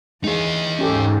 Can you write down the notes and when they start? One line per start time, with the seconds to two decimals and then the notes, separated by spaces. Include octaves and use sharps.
0.24 E3 G#3 D#4 G#4 D#5 F5
0.79 G#2 C#4 G4 A4